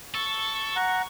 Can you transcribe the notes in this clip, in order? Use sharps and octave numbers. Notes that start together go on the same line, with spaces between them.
A4 C#6
F#5 A#5